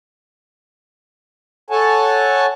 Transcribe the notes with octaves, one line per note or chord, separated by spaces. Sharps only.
A4 C#5 F#5 G#5 A5